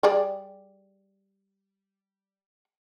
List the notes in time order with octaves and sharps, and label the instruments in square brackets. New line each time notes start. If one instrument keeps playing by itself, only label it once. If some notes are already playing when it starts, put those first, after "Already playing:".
[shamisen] G3 G#4 D5